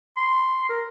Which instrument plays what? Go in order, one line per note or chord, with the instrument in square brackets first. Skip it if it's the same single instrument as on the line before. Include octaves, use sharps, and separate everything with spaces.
[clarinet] C6
A#4